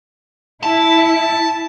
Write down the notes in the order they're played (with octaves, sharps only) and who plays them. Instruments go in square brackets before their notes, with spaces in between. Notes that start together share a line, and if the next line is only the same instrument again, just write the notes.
[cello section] E4 [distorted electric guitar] A5